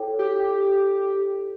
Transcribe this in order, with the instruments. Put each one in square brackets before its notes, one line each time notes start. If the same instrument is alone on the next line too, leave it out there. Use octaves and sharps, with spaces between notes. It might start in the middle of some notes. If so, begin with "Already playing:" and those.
Already playing: [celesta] E4 A4 C#5 G5
[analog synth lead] G4